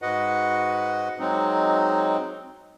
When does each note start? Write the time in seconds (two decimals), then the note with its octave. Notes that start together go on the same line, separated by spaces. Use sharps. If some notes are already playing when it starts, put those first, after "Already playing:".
0.02 G#2 F#4 B4 D#5 F#5
1.19 F#3 G#3 C4 D#4